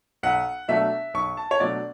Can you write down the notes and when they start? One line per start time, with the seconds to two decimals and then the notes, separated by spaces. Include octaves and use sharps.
0.23 B1 F#5
0.68 B2 F#3 A3 D4 E5
1.14 B1 C#6
1.37 A5
1.51 C#5
1.60 B2 F#3 A3 D4 D5